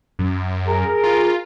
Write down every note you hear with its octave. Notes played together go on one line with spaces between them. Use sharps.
F#2
G#4 A#4
F4